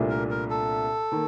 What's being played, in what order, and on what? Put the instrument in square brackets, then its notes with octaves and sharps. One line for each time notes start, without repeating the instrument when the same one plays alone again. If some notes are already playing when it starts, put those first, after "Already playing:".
Already playing: [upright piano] C2 A#2 A3 D4
[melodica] A#4
A#4
A4
[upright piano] D#3 A#3